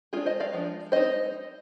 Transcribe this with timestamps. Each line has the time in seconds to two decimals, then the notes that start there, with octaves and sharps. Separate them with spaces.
0.13 G#3 D4 F4 G#4
0.26 C5 D#5
0.40 D5 F5
0.53 F3 G#3 D4
0.92 G#3 C4 D#4 C5 D#5